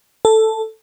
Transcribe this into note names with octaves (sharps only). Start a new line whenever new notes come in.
A4